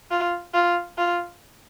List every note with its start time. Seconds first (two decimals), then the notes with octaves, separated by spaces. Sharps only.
0.11 F4
0.54 F4
0.98 F4